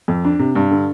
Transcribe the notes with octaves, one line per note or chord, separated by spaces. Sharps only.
F2
D4
C3
G2
D3